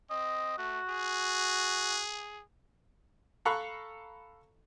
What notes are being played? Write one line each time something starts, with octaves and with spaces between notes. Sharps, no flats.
C4 D#5
A3 F#4
G#4
A4 F5 A#5 B5 C#6 F#6